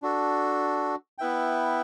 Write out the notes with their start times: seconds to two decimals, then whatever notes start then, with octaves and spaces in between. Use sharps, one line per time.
0.02 D4 F#4 A4
1.18 B3 E4 B4 E5 G5